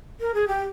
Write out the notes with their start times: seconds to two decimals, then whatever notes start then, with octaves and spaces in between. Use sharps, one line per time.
0.20 A#4
0.34 G#4
0.48 G4